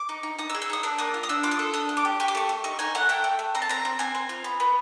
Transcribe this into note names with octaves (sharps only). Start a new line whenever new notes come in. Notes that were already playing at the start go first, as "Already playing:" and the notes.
Already playing: D6
D#4
D#4
D#4 D#6
E6
G#4
E6
D#4 D#6
D4 E6
A#3 D#6
F4
D#6
D4 E6
F4 D6
D#6
A4
D4 D#6
A3
D6
G4
G4 C#6
D6
A3 C#6
A3
D#4 C#6
D#4 G#5
A3 F#5
A3 G5
A3
A3
C4 A#5
A5
C4 A#5
C4
C4 G#5
C4
F4
B3
B3